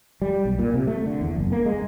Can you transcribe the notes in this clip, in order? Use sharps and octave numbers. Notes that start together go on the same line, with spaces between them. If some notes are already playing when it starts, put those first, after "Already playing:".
G3
B1
A#2
C3
A3
D3
E2
F#1
A#3
G#3